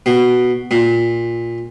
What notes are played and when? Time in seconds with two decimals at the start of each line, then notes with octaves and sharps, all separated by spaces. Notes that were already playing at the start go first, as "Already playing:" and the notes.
0.06 B2
0.71 A#2